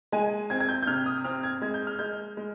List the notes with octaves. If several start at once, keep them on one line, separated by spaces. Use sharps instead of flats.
G#3 G#5
C4 G#6
G#6
G6
G6
C3 F6
D#6
C4 F6
G#6
G#3 G#6
G6
F6
G#3 G6
G#3